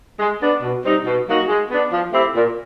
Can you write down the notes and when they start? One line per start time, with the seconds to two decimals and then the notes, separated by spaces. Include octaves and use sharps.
0.19 G#3
0.40 B3 D4
0.62 B2
0.83 G3 C4 D#4
1.05 B2
1.27 F#3 A#3 D#4 F#4
1.48 G#3
1.69 B3 D4
1.91 F3
2.12 A3 C4 E4 G4
2.33 A#2